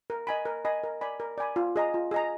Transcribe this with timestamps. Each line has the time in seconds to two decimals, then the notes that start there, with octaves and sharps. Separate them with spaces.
0.10 A#4
0.27 D#5 G#5 B5
0.45 A#4
0.65 D#5 G#5 B5
0.83 A#4
1.01 D5 G#5 B5
1.20 A#4
1.38 D5 G#5 B5
1.56 F4
1.76 G#4 D#5 A#5
1.94 F4
2.11 G#4 D#5 A#5